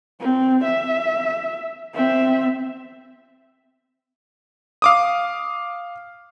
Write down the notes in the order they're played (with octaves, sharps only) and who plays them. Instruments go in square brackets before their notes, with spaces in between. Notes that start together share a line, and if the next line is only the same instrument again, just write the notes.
[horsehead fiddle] C4
E5
C4 E5
[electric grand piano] F5 D6 D#6